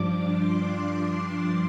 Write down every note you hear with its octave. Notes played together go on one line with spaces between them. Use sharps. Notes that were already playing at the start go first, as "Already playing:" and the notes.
Already playing: G2 F3 D4 D6
C6